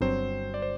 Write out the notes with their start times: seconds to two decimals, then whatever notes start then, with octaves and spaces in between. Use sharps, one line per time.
0.01 G1 G2 F#3 C4 C5
0.54 D5
0.62 C5